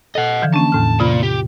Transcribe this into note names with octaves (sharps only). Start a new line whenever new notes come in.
A4 D#5 F#5
D3 E3 F3
A#3 C#4 D4 A5
E2 A2 F6
C3 A#3 F4 D5 B5
G4